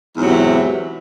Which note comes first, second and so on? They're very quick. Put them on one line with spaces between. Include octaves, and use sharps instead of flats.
E2 G#2 F#3 C3 E3